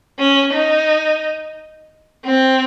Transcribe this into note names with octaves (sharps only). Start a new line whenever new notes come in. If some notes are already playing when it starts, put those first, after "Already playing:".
C#4
D#4
C4